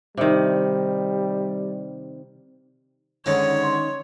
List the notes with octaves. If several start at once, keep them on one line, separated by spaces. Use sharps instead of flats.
C3 D#3 G3
G#2 D3 D#3 G#3 C#4 D#4 C#5
C6